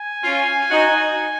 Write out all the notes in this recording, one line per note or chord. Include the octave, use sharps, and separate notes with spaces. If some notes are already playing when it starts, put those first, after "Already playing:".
Already playing: G#5
C#4 F4
D#4 F#4